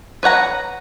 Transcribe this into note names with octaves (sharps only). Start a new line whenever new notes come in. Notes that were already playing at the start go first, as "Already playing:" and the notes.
B4 C#5 F#5 A#5